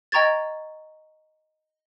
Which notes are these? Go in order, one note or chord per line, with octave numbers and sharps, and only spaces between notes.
D#5 G5 A#5 C#6 G#6 A6